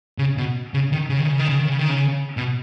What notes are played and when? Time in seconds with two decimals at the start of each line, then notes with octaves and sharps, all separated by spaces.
0.18 C#3
0.37 B2
0.74 C#3
0.92 D#3
1.09 C#3
1.20 D#3
1.29 C#3
1.39 D#3
1.49 C#3
1.59 D#3
1.69 C#3
1.79 D#3
1.90 C#3
2.37 B2